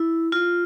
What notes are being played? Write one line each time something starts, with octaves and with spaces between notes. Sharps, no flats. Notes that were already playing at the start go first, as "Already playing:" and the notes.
Already playing: E4
F4